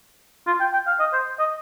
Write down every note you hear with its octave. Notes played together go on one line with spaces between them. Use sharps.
F4
G5
G5
F5
D#5
C5
D#5